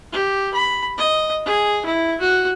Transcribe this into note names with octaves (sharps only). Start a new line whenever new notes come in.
G4
B5
D#5
G#4
E4
F#4